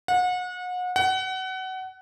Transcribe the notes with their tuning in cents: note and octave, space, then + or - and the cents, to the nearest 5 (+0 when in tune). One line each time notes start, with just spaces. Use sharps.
F#5 -35
F#5 +25